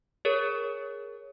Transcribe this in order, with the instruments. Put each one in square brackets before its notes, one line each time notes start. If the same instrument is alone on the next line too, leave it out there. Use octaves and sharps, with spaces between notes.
[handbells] G#4 A#4 C#5